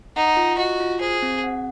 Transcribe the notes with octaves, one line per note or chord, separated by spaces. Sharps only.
D#4 F#5
F4
F#4 D#5
F4
G#4 C5
C4
F#5